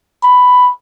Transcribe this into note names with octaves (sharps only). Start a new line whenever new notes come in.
B5